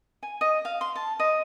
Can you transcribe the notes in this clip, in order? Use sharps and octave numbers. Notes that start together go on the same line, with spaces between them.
G#5
D#5
F5
C6
A5
D#5